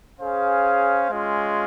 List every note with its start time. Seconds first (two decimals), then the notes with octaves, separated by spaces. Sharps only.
0.20 C#4 G#4 C5 F5
1.10 G#3 C#4 F4